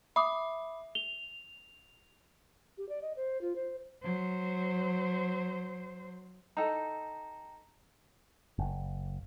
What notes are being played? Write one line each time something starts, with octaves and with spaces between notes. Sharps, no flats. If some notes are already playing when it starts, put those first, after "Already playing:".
E5 B5 D6 D#6
F7 G7
G4
D5
D#5
C5
F4
C5
F#3 C5
D#4 A4 G5 A#5
F#1